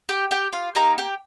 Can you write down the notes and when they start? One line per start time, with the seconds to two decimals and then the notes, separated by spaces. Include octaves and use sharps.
0.09 G4 G5
0.31 G4 G5
0.53 F4 F5
0.75 A#3 D#4 G4 A#4 A#5
0.98 G4 G5